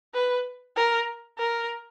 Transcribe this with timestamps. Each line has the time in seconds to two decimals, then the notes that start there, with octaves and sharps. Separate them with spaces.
0.14 B4
0.76 A#4
1.38 A#4